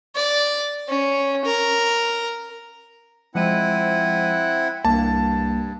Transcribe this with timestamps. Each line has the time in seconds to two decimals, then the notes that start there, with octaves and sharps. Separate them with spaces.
0.15 D5
0.88 C#4
1.45 A#4
3.35 F3 G#3 C4 E4 F#5 D#7
4.85 C2 G2 A#3 A5